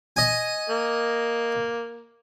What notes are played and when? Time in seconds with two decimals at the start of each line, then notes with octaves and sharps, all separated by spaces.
0.16 D#5 G#5
0.70 A#3